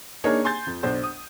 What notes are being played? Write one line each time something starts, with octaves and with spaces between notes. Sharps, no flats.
A#3 D4 D#4 G#4 A#4 C#5
G#5 C6 G6 A6
F2
B1 D4 C5
D#6